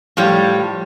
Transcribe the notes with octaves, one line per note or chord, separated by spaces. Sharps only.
A2 F3 G3 C#5